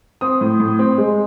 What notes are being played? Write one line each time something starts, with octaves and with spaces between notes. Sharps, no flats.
C4 D#6
A2
A2
C4
G#3